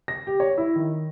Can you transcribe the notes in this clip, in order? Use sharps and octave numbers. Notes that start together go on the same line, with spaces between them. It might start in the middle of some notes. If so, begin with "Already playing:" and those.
A#6
G4
C#5
E4
D#3